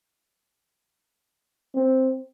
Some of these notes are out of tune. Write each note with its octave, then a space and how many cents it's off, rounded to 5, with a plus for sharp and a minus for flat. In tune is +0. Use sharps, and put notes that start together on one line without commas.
C4 +0